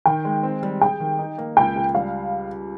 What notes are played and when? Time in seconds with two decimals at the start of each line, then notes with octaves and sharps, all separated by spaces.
0.06 D#3 G5
0.25 G#3
0.43 C4
0.63 G3
0.81 G#4 G5
1.00 D#3
1.19 D#4
1.38 A#3
1.57 C#2 G5
1.75 C#2
1.95 G3 F5